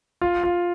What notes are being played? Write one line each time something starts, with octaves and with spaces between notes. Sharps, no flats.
F4
F4